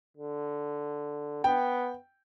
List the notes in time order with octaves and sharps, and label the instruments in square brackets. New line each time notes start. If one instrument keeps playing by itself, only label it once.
[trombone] D3
[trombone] B3 [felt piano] G5